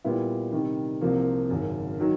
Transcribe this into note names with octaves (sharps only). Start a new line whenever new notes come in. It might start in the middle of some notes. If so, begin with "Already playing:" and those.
A#2 G3 B3 E4
C3 D#3 G3
C2 C3 F3 A#3
G#1 F#2 C#3
D#3 F#3